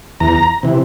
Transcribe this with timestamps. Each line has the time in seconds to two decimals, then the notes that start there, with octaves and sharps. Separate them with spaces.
0.20 E2 A#5
0.63 C3 E3